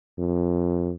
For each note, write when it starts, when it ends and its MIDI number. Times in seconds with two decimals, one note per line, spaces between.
0.18 0.93 41